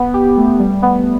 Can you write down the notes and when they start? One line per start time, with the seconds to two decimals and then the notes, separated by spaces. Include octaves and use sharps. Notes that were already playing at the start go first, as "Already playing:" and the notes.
Already playing: B3
0.14 G4
0.37 A3
0.59 G3
0.82 B3